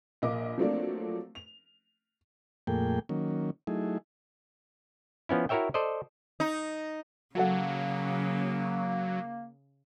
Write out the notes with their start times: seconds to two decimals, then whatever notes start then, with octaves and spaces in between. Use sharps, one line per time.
0.22 A#1 A#3 D#5 D6
0.58 F3 F#3 A3 A#3 C4 D4
1.35 F7
2.67 F2 A#2 A3 A#3 G#4 G5
3.09 D#3 F#3 A#3 C#4
3.67 F#3 A3 D#4 E4 G#4
5.29 F3 B3 C#4 E4
5.49 E4 F#4 A#4 C#5 E5 G5
5.74 A4 C5 D5 D#5
6.40 D#4
7.35 C#3 F#3 A#3 F#4 A4 F#5